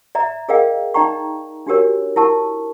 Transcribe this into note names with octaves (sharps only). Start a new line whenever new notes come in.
D5 E5 A#5
G#4 A#4 D5 D#5 F5 G5
D#4 D5 G5 A#5 C#6
D4 F#4 G4 A#4 C#5
E4 A#4 A5 C#6